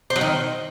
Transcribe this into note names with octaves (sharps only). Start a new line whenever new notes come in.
C4
F#3
D#3